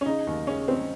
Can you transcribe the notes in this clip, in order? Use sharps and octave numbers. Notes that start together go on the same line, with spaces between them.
C#4
C#3 D#4
D#2
C#3 C#4
C4